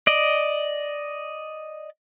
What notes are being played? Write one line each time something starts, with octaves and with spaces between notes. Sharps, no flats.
D5 D#5